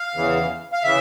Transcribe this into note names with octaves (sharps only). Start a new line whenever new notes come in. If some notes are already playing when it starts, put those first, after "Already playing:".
Already playing: F5
E2 C#3 E3
F5
C#3 E3 E5